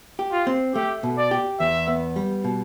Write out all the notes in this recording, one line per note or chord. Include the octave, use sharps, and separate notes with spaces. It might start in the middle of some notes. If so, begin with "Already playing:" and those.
G4
F4
C4
A3 G4
B2
D5
G4
E2 E5
B3
G3
B2